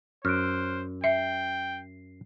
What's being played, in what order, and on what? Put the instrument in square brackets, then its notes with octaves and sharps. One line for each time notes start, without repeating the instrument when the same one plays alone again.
[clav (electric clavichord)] F#2 [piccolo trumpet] C5 [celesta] F6 F#6 D7
[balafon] E5 [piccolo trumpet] G5 [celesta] C7